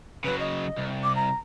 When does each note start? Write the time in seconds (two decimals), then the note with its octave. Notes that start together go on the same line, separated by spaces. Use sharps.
0.24 C#3 F#3 B4
0.40 D#5
0.77 C2
1.03 D6
1.16 A#5